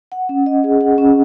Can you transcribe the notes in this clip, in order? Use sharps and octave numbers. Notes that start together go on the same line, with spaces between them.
F#5
C#4
D#5
G#4
F#5
C#4